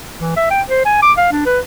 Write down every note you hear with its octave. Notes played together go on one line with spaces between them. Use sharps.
E3
E5
G5
C5
G#5
D6
F5
D4
B4